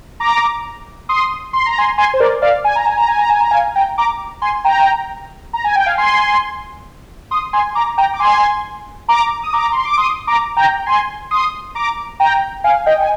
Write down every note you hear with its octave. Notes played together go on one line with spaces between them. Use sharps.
A#5 D6
C6 D#6
C6
A#5
G#5 C6
G#5 C6
C5
A#4 D5
D5 F5
G#5
A#5
G#5
A#5
G#5
A#5
G#5
A#5
F5 G#5
G5 A#5
A#5 D6
G#5 C6
G5 A#5
A#5
G#5
G5
F5 G#5
G#5 C6
C6 D#6
G#5 C6
A#5 D6
G5 A#5
D6
G#5 C6
A#5 D6
D#6
A#5 D6
C6
D6
C6 D#6
A#5 D6
G5 A#5
G#5 C6
C6 D#6
A#5 D6
G5 A#5
F5 G#5
D#5 G5
G#5